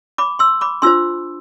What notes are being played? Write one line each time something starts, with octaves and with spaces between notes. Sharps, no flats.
B5 D6
C6 E6
B5 D6
D4 F4 C5 C6 E6